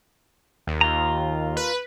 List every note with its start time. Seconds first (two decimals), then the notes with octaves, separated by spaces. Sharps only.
0.67 D#2
0.81 F4 A#5
1.57 B4